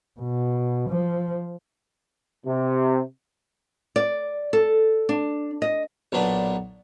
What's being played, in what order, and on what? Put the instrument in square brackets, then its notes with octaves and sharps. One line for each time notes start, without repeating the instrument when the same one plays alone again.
[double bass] B2
F3
[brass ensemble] C3
[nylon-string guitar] D5
A4
D4
D#5
[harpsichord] B1 A#2 B3 D4